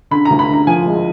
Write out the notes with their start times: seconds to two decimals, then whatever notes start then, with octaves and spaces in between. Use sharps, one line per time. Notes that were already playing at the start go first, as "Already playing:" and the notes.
0.11 D3 B5
0.25 D2 A#5
0.39 B5
0.49 D3 A#5
0.67 F3 G#5
0.86 G#3